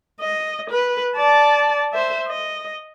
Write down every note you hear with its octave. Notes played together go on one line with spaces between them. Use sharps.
D#5
B4
D5 A5
C5 E5
D#5